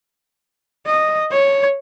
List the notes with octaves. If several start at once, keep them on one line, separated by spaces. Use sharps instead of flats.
D#5
C#5